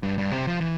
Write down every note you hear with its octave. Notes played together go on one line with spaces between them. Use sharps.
G2
G2
C3
F3
E3